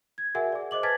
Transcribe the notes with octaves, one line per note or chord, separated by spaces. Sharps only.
G#6
F#4 G#4 A#4 E5 F#5 G#5
G#4 D5
C5 D#5 D6 F#7
B4 G#5 A5 G#6 A6 B6